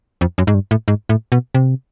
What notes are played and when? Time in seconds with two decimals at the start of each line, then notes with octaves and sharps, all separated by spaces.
0.21 F2
0.38 F#2
0.47 G#2
0.54 G2
0.71 A2
0.88 G#2
1.09 A2
1.32 B2
1.55 C3